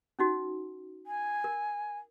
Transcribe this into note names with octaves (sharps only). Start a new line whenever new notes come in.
C#4 D#4 F#4
G#5
A#4